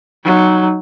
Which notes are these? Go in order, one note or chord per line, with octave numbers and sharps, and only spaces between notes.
F#3 D#4